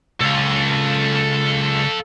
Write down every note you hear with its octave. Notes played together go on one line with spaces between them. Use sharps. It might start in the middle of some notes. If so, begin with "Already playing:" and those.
C#2 A4 F5